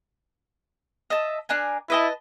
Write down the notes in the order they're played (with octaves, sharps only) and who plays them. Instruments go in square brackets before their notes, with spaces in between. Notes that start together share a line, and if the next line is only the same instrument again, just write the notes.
[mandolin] D#5 E5 A5
D4 A#4 G#5
[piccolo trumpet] E4 [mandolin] B4 D#5 A5